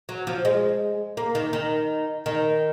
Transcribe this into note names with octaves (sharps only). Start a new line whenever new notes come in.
F#3
F3
G#3
A#3
D#3
D#3
D#3